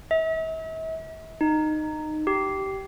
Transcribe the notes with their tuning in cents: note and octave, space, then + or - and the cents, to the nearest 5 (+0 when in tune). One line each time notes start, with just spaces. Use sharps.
E5 -40
D#4 -15
G4 -15